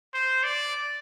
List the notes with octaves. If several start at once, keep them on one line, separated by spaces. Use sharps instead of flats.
C5
D5